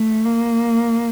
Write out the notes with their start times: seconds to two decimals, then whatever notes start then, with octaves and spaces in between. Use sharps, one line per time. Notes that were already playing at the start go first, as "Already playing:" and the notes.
Already playing: A3
0.25 A#3